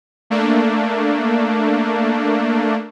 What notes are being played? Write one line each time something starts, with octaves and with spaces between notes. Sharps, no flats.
A3 A#3 D4